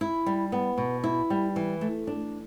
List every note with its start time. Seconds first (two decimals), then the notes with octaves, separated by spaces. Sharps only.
0.01 E4
0.26 G3
0.52 B3
0.78 B2
1.04 E4
1.30 G3
1.56 E3
1.81 A3
2.07 D4